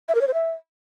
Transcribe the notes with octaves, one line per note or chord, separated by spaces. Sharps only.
E5
A#4
C#5
C5
E5